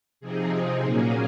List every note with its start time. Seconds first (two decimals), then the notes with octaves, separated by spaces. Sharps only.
0.21 C3 F3 C4 D#4 G#4
0.83 A#2 F#3 A#3 C#4